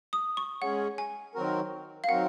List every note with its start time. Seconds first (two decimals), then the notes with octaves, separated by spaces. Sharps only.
0.13 D#6
0.37 C#6
0.62 G#3 C#4 G#4 C#5 F#5
0.98 G#5
1.35 D#3 F#3 C4 F#4 A#4
2.04 F5
2.09 D#3 F#3 C4 F#4 A#4 F#5